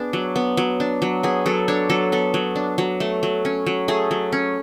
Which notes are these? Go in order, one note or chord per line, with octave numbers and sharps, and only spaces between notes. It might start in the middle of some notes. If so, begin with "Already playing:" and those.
Already playing: B3 D4 G#4
F#3
B3
F#3
D4
F#3
B3 G#4
F#3 A4
D4 C#5
F#3 A4
B3 A4
F#3
D4
F#3
A3
F#3
C#4
F#3
A3 G#4
F#3
C#4